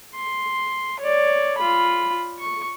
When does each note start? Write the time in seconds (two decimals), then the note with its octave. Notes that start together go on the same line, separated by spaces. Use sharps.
0.15 C6
1.00 C#5 D5
1.58 F4 B5
2.39 C#6